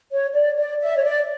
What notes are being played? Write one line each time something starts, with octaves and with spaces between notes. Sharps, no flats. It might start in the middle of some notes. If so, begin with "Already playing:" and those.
C#5
D5
D5
E5
C#5
D5